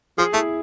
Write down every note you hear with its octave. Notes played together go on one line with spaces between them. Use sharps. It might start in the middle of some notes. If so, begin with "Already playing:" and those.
F3 G#4
A3 E4